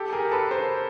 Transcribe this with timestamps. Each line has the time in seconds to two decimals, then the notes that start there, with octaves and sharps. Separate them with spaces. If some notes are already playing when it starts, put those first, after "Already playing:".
Already playing: G4 A4
0.12 G#4 A#4
0.32 A4 B4
0.50 A#4 C5